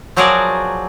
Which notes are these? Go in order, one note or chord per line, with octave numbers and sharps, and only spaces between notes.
F3 F#3 F#4 G#4 A#4 D5